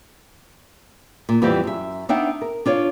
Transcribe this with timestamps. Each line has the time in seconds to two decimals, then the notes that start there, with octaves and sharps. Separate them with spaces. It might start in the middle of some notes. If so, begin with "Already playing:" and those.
1.29 A#2
1.42 F2 E3 G3 B3 C4 G4
1.64 F#2 E5
2.09 B3 D4 D#4 E5 F#5 G5
2.41 A#4
2.66 D4 F4 C#5